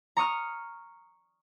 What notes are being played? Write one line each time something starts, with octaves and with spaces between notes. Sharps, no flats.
A#5 C#6 D#6 F6